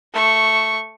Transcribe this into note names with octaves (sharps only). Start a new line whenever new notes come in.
A3 C#6